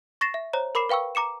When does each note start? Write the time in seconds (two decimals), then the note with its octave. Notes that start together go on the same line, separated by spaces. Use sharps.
0.21 C#6 A6 A#6 C7 E7
0.34 E5
0.53 C5 C#5 A#5
0.75 A#4 B5 D6 C7 E7
0.89 B4 F5 G5 C#6 E6
1.15 A#5 D6 C#7 E7